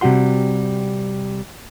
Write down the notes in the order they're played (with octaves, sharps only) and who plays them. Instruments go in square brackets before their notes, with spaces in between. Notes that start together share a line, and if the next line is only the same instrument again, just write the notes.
[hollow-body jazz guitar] C3 G3 F#4 F#5 C6